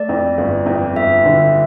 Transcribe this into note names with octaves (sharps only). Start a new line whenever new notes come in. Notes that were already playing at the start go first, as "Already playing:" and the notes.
Already playing: A3 D5
F2
G1
F2
G1 E5
D3